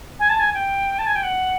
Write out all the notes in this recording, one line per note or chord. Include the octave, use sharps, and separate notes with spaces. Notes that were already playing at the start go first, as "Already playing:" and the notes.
G#5
A5
G#5
G5
A5
G#5
G5
F#5